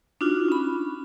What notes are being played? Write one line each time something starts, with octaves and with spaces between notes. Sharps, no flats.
D4 D#4 F4 F#4
C#4 B5